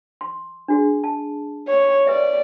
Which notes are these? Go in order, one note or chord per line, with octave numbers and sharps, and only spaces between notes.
C6
D4 F#4 G#4
A5
C#5
B4 D5 E5